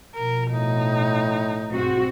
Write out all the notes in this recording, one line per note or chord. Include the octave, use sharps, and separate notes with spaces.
B2 F3 A#4
A2 D#4
B1 G#2 C4 F#4